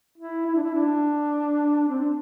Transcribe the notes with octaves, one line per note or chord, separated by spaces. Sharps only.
E4
E4
D4
E4
D4
C4
D4